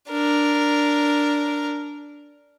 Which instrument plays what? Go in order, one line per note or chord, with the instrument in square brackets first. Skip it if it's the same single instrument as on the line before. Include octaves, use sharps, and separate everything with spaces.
[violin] D4 A#4